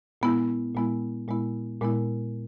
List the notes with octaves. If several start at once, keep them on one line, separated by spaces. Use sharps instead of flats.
A#2 G#3 B3 E4
A#2 G#3 B3 E4
A#2 G#3 B3 E4
A#2 G#3 B3 E4